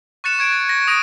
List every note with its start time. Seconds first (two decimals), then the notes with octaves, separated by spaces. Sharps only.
0.24 C#6 F#6 A6 C#7 E7
0.39 C#6 G#6 D7
0.52 A6
0.69 A#6
0.88 D#6 A#6 D7 D#7